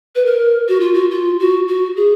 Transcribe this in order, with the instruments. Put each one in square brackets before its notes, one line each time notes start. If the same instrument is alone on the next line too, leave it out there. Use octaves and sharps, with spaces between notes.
[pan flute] B4
A#4
F#4
F4
F#4
F4
F#4
F#4
G#4